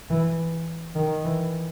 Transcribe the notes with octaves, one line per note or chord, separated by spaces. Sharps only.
E3
D#3
E3